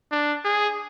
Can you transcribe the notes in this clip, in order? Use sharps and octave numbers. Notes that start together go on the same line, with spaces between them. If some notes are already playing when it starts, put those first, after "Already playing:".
D4
G#4